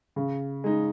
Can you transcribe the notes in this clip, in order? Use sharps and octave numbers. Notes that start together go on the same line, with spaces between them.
C#3
G#3 D#4